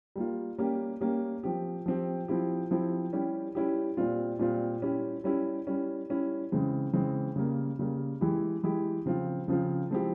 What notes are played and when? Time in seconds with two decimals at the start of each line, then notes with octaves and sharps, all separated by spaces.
0.16 G3 A#3 F4
0.58 G3 A#3 C#4 G4
1.01 G3 A#3 C#4 G4
1.43 F3 C4 G4
1.86 F3 C4 G4
2.28 F3 C4 E4 G4
2.71 F3 C4 E4 G4
3.13 G3 C#4 E4 G4
3.55 G3 C#4 E4 G4
3.97 A#2 G3 C4 F4
4.39 A#2 G3 C4 F4
4.82 G3 C#4 E4 G4
5.24 G3 C#4 E4 G4
5.67 G3 C#4 E4
6.09 G3 C#4 E4
6.52 C#3 E3 G#3 C4
6.93 C#3 E3 G#3 C4
7.36 C#3 G3 A#3
7.79 C#3 G3 A#3
8.21 E3 G#3 E4 G4
8.64 E3 G#3 E4 G4
9.06 C#3 F3 C4 F4
9.48 C#3 F3 C4 F4
9.91 F3 G#3 C4 E4 G4